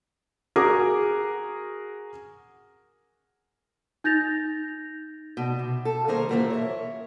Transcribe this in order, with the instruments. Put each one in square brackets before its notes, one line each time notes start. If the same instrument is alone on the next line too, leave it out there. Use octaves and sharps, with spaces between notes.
[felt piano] F#4 G#4 A#4 D6
[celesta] D#4 G6 A6 A#6 F7
[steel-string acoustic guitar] B2
C3
A4
D#3 G3 A#3 G#4 A#4 C5
F#2 A#2 E3 A3 A#3 A#4
C#5 E5